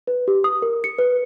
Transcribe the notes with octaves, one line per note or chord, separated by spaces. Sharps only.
B4
G4
D#6
A#4
C#7
B4